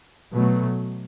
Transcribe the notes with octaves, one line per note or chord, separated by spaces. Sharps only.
B2 F#3 A3